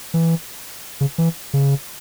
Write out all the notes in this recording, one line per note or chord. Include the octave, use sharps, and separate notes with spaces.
E3
C#3
E3
C#3